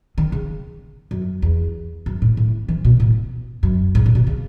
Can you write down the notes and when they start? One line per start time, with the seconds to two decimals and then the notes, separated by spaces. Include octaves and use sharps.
0.18 D#3
0.32 C#3
1.11 F#2
1.42 E2
2.06 F#2
2.22 A2
2.37 A2
2.68 E3
2.85 B2
3.00 A2
3.63 F#2
3.95 G#2
4.06 A2
4.15 B2
4.27 C#3